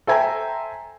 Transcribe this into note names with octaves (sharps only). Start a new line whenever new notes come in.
A4 C5 E5 G5 G#5 A#5